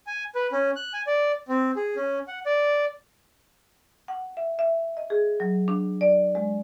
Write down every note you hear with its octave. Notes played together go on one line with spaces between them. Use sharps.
G#5
B4
C#4
F#6
G#5
D5
C4
G#4
C#4
F#5
D5
F#5
E5
E5
D#5
G#4
F#3
D4
D5
G#3